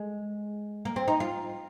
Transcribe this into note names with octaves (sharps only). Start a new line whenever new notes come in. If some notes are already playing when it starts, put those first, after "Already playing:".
Already playing: G#3
A#3
C4
D#4
F4